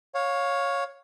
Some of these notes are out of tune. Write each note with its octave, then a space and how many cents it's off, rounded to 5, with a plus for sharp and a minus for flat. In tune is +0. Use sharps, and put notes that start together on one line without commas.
C#5 +0 F5 +20